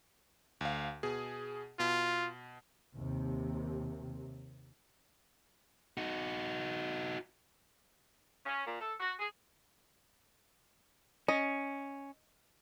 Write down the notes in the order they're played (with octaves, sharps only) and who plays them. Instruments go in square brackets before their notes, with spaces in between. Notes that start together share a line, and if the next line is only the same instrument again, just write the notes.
[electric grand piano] D2 F5
B2 G#4
[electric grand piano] B2 [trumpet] F4
[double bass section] D#2 C3
[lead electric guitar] D#4 F#4
[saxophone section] C#4
A#2
A4
F#4
G#4
[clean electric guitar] C#4 [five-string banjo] D#5